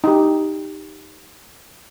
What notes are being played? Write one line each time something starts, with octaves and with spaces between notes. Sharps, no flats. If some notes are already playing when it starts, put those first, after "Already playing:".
D#4 G4